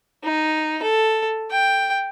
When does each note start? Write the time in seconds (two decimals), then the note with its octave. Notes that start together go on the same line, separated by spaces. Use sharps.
0.24 D#4
0.83 A4
1.51 G5